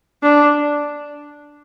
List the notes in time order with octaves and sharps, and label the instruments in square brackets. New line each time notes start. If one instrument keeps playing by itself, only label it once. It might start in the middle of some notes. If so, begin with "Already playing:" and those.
[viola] D4